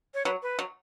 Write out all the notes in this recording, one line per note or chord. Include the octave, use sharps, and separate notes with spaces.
C#5
F#3 B4
B4
F#3